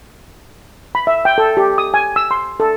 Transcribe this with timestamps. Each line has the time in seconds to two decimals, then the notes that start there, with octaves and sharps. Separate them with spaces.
0.95 B5
1.07 E5
1.25 G5
1.38 A4
1.57 G4
1.78 D#6
1.94 G#5
2.16 E6
2.31 C6
2.60 A4